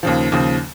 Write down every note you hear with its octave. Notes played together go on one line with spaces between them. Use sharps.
D#2 C#3 F3
D#2 C#3 F3